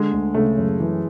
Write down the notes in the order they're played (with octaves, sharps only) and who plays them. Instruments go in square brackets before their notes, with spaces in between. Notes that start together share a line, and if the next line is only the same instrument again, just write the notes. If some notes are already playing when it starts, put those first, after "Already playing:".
Already playing: [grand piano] D3 [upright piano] G#3
[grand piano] D2
[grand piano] C#3 [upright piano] A3
[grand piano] F#2
E3